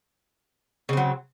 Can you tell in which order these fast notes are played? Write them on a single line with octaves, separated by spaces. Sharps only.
C#3 C4 F#3